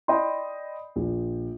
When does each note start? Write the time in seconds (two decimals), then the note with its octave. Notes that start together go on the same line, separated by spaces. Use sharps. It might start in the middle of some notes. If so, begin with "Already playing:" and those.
0.08 D5 D#5 G5 B5 C6
0.96 A#1